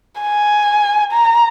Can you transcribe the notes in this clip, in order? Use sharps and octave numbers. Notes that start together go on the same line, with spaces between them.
G#5
A#5